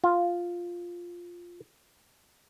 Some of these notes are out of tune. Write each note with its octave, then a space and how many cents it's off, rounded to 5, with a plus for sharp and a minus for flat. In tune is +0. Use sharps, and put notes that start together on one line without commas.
F4 +0